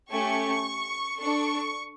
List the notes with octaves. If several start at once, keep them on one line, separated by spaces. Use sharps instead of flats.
A3 C#4 G4 C#6
D4 A4 C#6